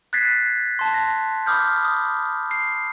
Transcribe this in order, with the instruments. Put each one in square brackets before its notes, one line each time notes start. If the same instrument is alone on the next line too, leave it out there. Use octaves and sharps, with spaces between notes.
[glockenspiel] F#6 G#6 A6 B6 C7
A5 C6
A#6
B5 D6 D#6 F6 G6
D#6
C7